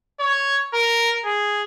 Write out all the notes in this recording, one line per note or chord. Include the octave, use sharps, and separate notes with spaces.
C#5
A#4
G#4